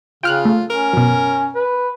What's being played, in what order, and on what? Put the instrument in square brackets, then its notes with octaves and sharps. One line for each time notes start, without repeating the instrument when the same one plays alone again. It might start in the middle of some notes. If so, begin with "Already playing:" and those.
[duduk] C#3 [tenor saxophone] F4 [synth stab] G5 F6 F#6
[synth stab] A3
[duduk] C#4 [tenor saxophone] A#4
[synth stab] F#2 B2
[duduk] B4